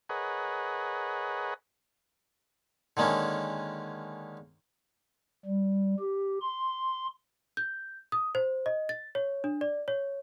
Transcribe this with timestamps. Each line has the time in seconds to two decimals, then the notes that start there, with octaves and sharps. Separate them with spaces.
0.09 G#4 A#4 B4 C#5 D#5 F#5
2.97 D3 D#3 G#3 A#3 C#4
5.46 G3
5.99 G4
6.42 C6
7.57 G6
8.12 D#6
8.35 C5
8.66 D#5
8.89 A6
9.15 C#5
9.44 D4
9.61 D5
9.88 C#5